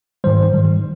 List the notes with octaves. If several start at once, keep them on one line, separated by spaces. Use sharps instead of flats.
G#2 D#3 G3 C5
G#2 D#3 G3